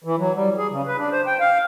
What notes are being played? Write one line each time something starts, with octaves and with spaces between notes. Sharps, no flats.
E3
F#3
G3
G#4
C#3
B4
D4
C5
G5
F5